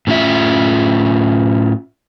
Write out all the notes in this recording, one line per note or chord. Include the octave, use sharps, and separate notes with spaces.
A2 C#4 F4 E5